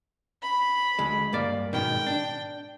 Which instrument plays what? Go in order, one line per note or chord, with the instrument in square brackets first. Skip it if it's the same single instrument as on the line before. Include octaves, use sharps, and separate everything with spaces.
[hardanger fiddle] B5
[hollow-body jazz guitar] D2 G#3
G2 A#3 D5
[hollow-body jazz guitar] G#2 B2 D#3 [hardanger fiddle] G5
[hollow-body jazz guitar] D4